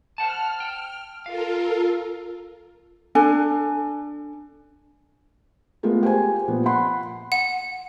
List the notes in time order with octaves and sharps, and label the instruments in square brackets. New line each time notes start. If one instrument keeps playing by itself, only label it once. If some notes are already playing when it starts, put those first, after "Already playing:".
[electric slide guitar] C5 F#5 A5 [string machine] F6
[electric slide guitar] G5
[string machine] F4 A4 A#4 [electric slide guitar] F5
[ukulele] D4 A4 G#5
[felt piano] G#3 A3 B3 F4 A#4
G4 C5 G#5
A#2 F3 B3
F#5 B5 C6
[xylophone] F#5